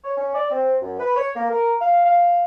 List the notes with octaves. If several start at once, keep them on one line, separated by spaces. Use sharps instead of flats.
C#5
C#4
D5
C4
F#2
B4
C#5
A#3
A#4
F5
F5